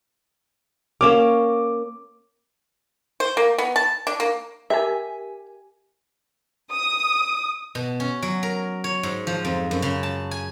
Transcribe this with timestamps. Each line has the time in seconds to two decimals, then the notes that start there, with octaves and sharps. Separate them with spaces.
1.01 A#3 C#4 A#4 D6 E7
3.20 C5
3.37 A#3
3.58 B3
3.76 A5
4.07 D4
4.20 A#3
4.70 G4 A#4 E5 G#5
6.72 D#6
7.75 B2
8.00 C#4
8.22 F#3
8.43 A#4
8.84 C#5
9.03 G#2
9.27 F3
9.45 F2
9.71 F#2
9.82 C#3
10.03 A5
10.31 G#5